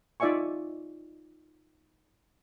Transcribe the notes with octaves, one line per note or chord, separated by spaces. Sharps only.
D#4 F4 D5 E5 G#5 C#6